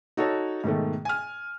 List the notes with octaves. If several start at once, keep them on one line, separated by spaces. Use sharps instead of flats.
D#4 F#4 A4 C#5
G#2 B2 D#3 A3
G#5 F6